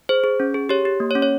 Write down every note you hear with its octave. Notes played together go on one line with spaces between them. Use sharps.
G#4 C5
G#4
C#4
G#4
G4 C#5
G4
A#3
C#5
C#4
C#5